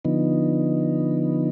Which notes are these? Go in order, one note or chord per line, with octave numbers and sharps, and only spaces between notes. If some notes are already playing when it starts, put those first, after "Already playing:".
D3 F3 B3 D#4